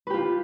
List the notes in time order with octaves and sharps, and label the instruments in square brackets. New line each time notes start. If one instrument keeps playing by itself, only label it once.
[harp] B4
G4
F4